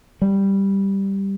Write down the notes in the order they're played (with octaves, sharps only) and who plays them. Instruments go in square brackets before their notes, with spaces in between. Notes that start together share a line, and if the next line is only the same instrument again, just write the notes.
[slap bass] G3